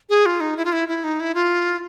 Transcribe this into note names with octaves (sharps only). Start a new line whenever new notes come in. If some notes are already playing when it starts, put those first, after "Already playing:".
G#4
F4
D#4
E4
F4
E4
E4
D#4
E4
F4